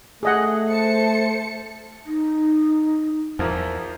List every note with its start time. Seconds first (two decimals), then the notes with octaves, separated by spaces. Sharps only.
0.23 A3 G#4 D#5 F#5
0.70 C5 A5 C#7
2.06 D#4
3.39 E2 F3 F4 A#4